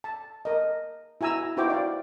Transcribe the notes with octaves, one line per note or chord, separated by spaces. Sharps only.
A5
A#4 D#5
E4 F#4 G#5 A#5 E6
D#4 E4 F#4 C5 G5 D6
D5 F5